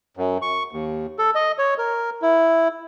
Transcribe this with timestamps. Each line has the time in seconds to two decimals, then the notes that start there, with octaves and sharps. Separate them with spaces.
0.17 F#2
0.42 C#6
0.72 D#2
1.19 A4
1.35 D#5
1.58 C#5
1.78 A#4
2.22 E4